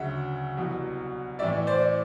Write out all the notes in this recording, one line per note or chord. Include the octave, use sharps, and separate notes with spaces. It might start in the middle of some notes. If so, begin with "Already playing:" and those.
Already playing: D2 C#3 F#3 E5 F#5
C2 B2 F#3
A2 E3 A3 D5 E5
C5 D5